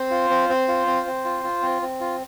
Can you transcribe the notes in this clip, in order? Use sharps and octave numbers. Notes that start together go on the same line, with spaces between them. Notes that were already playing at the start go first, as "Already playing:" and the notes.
Already playing: C4 C5
F4
C4
C4
F4
C4
C4
F4
F4
C4
C4
F4